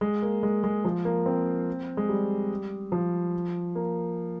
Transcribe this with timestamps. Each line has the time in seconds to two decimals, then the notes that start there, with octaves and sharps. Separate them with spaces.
0.01 G#3
0.23 A#3
0.43 G#3
0.64 G#3
0.85 F3
1.05 A#3
1.26 C4
1.97 G#3
2.09 G3
2.92 F3
3.75 A#3